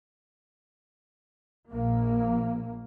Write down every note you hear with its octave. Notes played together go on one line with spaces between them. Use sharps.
A#1 A#3